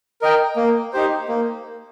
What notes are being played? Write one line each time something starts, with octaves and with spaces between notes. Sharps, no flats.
A#4 D#5 G5
A#3
D#4 G4 C5
A#3